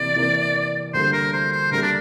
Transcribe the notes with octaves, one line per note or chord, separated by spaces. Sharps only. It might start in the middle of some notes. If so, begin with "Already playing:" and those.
Already playing: C3 E3 A#3 D5
C3 E3 A#3
D2 D3 G3 A#3 C5
A#4
C5
C5
D2 D3 G3 A#3 A#4
D4